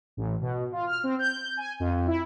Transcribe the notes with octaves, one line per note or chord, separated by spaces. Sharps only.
A1
B2
F4
F6
C4
G6
G#5
F2
E4